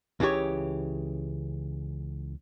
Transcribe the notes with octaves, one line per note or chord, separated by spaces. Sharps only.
C#2 C#3 E3 G4 C#5